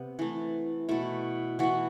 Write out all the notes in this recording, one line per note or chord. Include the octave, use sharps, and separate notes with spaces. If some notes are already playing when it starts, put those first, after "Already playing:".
Already playing: C3 B3
E3 A3
B2 A3 E4
E3 B3 F#4